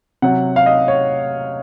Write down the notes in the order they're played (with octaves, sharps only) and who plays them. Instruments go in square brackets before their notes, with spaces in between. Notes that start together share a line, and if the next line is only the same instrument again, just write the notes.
[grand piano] C3 F#3 F#5
F5
D#5
C#5